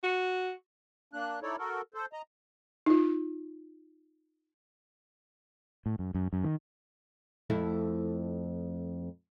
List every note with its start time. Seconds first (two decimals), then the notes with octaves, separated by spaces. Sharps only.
0.03 F#4
1.14 A#3 D4 F#6
1.43 D#4 E4 A4 C#5 D5
1.58 F#4 A4 A#4
1.94 A4 C5
2.13 D#5 A#5
2.86 D#4 F4
5.86 A2
5.99 F#2
6.15 F#2
6.33 F#2
6.44 D#3
7.50 F2 A3 E4